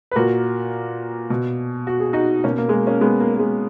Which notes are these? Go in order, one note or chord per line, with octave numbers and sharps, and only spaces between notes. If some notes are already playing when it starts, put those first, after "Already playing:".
B4
A#2 F#4 A#4
B2
F#4
G#4
D#4 F#4
B2 A#3 C#4
A#3
G#3
A#3
A#3 C#4
G#3 B3
A#3
A#3
G#3